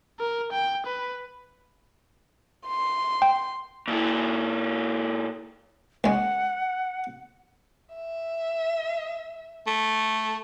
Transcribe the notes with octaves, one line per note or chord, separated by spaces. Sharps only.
A#4
G5
B4
C6
G5
A#2 E4
C#2 G#3 F#5
E5
A3